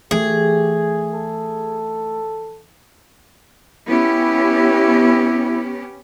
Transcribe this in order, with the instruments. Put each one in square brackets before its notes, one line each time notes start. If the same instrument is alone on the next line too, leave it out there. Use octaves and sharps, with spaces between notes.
[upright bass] E3 [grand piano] A3 [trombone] G4 [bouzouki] G#4
[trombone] A4
[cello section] B3 C#4 G4 [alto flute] E4